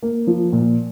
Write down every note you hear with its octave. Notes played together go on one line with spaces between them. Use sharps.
A#3
F3
A#2